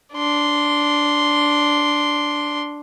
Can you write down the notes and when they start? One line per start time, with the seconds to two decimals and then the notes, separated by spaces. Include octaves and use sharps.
0.15 D4 C6